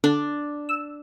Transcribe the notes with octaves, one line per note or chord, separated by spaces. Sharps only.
D3 D4
E6